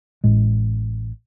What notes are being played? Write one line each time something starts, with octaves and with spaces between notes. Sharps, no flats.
A1 A2 G#3